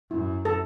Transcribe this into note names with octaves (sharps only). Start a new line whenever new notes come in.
F#2 E4
A4